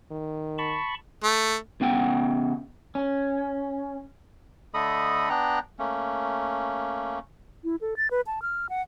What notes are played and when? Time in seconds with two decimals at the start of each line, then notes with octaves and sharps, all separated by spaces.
0.11 D#3
0.58 A5 B5 C#6
1.24 A3
1.81 C#3 B3 F#5 G5
2.95 C#4
4.74 D3 A3 A4 D#5 B5 D#6
5.30 B3 D4 G5 A#5 F#6
5.79 A3 A#3 C#4
7.64 E4
7.81 A4
7.97 A6
8.11 B4
8.27 A5
8.42 F6
8.69 F#5